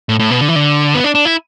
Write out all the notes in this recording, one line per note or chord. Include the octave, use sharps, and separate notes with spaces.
A2
A2
B2
D3
E3
D3
B3
D4
D4
E4